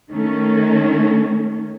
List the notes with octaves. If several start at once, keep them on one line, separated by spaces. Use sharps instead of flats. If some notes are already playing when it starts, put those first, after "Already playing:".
D#3 A3 C#4